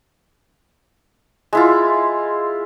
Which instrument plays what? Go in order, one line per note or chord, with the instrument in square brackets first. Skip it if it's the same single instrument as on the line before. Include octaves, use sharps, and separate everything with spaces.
[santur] G#3 E4 F4